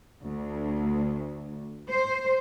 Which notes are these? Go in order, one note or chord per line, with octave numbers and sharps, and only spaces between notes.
D2
C5